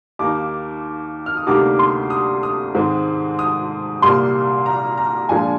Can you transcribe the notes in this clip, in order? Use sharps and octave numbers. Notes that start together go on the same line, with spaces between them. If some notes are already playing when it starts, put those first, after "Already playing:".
D#2 D#3 A#3 D#4 D6
F6
D#6
D2 C3 G3 A#3 D#4 D6
C6
D#6
D#6
G#2 D#3 G#3 C4
D#6
C2 A#2 G3 A#3 C6
A#5
A#5
A#2 F3 G#3 D4 G#5